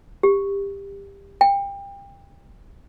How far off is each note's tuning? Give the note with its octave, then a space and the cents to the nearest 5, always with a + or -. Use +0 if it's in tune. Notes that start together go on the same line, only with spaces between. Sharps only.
G4 +20
G5 +25